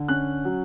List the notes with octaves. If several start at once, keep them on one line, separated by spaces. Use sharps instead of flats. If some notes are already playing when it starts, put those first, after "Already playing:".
Already playing: D3
C#4 F#6
F#3